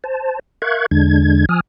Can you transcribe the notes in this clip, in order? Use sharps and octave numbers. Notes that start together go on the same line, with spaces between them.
C5 A5
A#4 E5 F5 C#6 F#6 G#6
E2 D3 G#3 D4 G#6
F3 G#5 D#6 F6